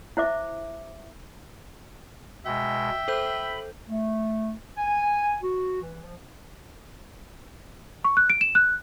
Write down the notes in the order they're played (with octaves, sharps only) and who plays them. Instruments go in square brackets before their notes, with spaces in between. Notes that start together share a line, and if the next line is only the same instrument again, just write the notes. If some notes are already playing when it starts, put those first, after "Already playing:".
[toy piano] E4 C5 E5 D6
[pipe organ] B2 G#3 [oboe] E5 [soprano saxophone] G5
[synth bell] A4 C5 G6 [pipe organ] B5
[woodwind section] A3
G#5
F#4
E3
F3
[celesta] C#6
F#6
D7
E7
F#6